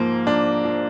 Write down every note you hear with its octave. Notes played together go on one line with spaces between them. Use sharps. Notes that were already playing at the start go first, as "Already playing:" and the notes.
Already playing: G#2 F3 A#3
F3 D4
F3